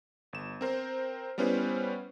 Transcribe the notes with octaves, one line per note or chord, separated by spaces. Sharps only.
G1 E7
C4 A#4 C5
G3 B3 C#4 E4 B4 C5